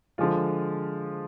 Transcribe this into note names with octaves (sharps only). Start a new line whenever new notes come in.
D3 F3 G#3 F4